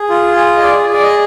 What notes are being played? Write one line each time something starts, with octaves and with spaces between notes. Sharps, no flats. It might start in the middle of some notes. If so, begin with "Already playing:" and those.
Already playing: G#4
F4
G#4
D#5
G#4 D5
G#4 D5
D#5